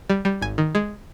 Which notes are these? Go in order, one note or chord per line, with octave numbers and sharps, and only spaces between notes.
G3
G3
G#1 G#5
D#3
G#3